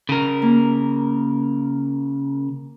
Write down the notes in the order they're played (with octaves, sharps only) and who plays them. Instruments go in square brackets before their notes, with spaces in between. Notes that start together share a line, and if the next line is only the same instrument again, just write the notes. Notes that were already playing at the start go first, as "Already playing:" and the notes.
[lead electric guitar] C#3 A#4
[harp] A#3